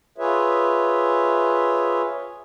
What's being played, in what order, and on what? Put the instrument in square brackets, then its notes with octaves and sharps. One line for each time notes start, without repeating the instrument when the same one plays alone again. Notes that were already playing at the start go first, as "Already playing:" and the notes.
[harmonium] F4 G#4 B4 C#5 E5